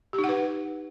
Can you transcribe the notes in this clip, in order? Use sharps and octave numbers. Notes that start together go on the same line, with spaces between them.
G4
D#4
F#5
B4